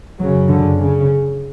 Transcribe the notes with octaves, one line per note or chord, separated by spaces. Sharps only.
F#2 C#3 F#3
D3
C#3